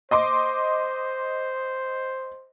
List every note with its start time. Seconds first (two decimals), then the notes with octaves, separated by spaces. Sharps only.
0.11 C5 D#5 C6 D6